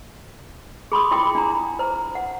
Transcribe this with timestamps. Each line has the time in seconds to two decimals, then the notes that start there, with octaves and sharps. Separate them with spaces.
0.92 G#4 B5 C6 D#6
1.11 E4 F4 G5 D6 D#6
1.35 D4 A#5
1.79 C5 A#5
2.15 F#5